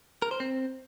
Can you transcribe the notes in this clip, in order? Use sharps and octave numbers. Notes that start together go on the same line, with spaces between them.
A#4
C5
C4